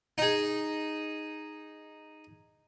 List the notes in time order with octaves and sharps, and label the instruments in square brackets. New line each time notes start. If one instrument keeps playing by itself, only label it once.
[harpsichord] D#4 G#4